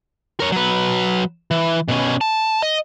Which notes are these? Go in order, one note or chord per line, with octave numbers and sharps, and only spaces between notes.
A#4 C#5
F#3 B4
E3
B2 C#4
A5
D#5